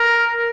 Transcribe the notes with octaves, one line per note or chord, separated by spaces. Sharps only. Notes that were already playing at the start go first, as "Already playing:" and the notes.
Already playing: A#4